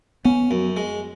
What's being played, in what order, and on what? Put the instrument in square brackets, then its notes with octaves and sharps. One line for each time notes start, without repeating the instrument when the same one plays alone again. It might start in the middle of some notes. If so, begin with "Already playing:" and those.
[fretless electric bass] B3 [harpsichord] C#4
[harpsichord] F#2
G#3